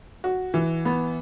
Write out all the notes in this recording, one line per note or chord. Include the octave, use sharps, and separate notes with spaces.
F#4
E3
B3